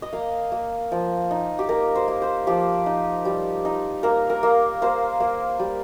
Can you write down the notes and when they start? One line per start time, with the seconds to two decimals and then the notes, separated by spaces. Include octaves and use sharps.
0.02 D#5
0.13 A#3 F5
0.52 A#3
0.92 F3
1.31 D#4
1.59 G4
1.69 A#3 A#4
1.95 C5
2.08 A#3
2.22 C5
2.47 F3 G4
2.86 D#4
3.25 G3
3.65 D#4
4.03 A#3 A#4
4.30 A#4
4.43 A#3
4.82 A#3 C5
5.20 A#3
5.59 G3